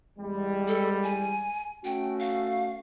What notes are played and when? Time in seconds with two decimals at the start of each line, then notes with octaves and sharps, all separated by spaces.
0.19 E2 G3 G#3
0.68 A4
1.03 G#5
1.85 A3 C#4 F#4 G5
2.19 F5